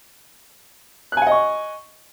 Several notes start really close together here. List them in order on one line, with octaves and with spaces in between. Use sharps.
F#6 G#5 F#5 D#5 C#6